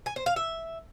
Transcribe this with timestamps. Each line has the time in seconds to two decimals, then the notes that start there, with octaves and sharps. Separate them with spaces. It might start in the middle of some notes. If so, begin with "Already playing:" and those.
0.06 G#5
0.16 C5
0.26 F5
0.36 E5